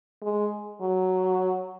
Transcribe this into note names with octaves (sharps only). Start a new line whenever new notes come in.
G#3
F#3